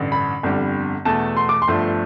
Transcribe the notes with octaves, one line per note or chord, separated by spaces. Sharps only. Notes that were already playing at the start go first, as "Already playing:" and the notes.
Already playing: A1 G2 D3
B5
G1 F2 D3 G3
E2 B2 A3 A5
C6
D6
C6
G1 G2 F3 A3